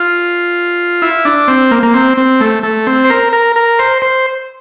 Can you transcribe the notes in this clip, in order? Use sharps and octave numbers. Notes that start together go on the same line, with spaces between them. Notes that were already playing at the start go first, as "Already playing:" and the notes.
Already playing: F4
E4
D4
C4
A#3
A#3
C4
C4
A3
A3
C4
C5
A#4
A#4
A#4
C5
C5